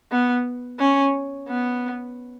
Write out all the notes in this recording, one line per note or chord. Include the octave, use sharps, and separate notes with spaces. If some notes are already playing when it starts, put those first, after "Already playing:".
B3
C#4
B3